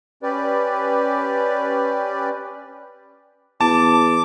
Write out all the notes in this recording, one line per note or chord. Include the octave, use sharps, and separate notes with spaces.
C#4 G4 B4 D5
E2 A5 D6